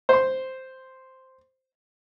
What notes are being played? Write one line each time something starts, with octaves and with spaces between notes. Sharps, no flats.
C5 C6